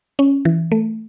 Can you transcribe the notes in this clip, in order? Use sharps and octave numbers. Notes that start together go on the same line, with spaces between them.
C#4
E3
A3